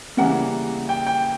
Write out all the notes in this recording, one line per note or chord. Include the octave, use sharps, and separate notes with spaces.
C#3 E3 G3 A#3 F#5
G5
G5